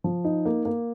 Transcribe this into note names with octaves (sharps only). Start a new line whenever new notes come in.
F3
D#4
A#3
A#3